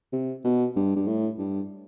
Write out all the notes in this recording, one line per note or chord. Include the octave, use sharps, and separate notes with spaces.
C3
B2
G2
G2
A2
G2